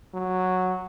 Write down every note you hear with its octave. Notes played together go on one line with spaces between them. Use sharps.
F#3